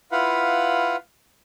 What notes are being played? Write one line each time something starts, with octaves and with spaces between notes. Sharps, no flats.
E4 F4 B4 F5 F#5 B5